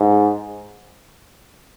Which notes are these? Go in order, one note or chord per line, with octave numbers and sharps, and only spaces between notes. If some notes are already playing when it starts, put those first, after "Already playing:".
Already playing: G#2